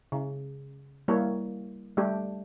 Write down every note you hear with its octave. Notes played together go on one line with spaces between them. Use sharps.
C#3
G3 A#3 E4 C#5
G3 A3 D4 G4